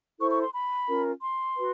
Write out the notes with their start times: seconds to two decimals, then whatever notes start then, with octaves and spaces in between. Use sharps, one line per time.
0.20 E4 A4 C5 C#6
0.31 C#6
0.42 C6
0.54 B5
0.88 C#4 F4 A#4
1.22 C6
1.57 F#4 B4